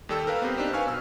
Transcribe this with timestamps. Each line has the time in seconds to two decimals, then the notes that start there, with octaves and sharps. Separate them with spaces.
0.09 D#2 G3 A4 G5 E6
0.27 A#4 B4 F5
0.42 B3 C4 G4 C5
0.57 D4 D#4 G4 C5
0.73 B4 F5 G#5 C#6 F6
0.87 B2 E6